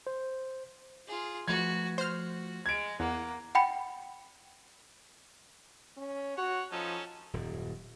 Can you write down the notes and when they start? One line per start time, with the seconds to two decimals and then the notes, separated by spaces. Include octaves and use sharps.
0.07 C5
1.07 F4 G#4
1.48 F3 A3 F#4 B4 G#6
1.98 F#4 C5 F6
2.66 G#3 G#6 D7
3.00 E2 A#3 F#5
3.55 F#5 G5 B5 C#7
5.97 C#4
6.37 F#4 C#5 F#5
6.72 F3 C#4 D#4 A4
7.33 D#1 F#2